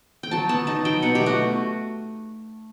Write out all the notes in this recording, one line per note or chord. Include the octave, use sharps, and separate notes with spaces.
G5
F#3 A5
B3 A5
D#4 A5
F#3 G5
B2 F#5
G4
A3
F#4